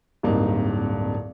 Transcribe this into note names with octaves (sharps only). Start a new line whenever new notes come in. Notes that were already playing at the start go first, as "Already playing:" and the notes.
D1 G2 A#3 C4 D#4